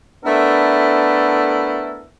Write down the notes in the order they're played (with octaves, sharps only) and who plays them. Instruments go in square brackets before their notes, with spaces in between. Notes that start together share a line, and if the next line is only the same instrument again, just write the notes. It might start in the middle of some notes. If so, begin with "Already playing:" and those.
[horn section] A3 B3 D4 E4 A4 A#4